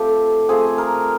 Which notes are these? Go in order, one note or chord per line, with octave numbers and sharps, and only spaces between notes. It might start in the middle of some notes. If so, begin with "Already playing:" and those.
Already playing: F3 A3 C4 G4 A4
F3 A3 C4 G#4
A#4